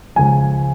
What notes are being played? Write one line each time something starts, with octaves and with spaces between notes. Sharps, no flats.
C#2 C#3 F3 G#3 G#5